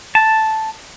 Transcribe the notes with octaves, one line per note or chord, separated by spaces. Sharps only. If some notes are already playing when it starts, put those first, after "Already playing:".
A5